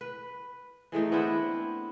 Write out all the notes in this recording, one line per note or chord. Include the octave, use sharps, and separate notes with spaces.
B4
E3 G#3 A3 D#4
B3 C4 D4 E4